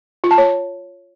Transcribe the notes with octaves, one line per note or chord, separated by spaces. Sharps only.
F4
A5
C#5